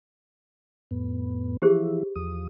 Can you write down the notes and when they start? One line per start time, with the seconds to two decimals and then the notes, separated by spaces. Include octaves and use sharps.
0.91 F2 A2 B3
1.62 E3 F3 E4 G4 G#4 C5
2.16 E2 F3 D#6